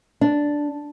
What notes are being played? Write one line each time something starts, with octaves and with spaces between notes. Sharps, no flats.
D4